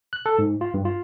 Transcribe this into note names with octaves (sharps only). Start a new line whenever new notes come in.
F#6
A4
G#2
F4
G2
F4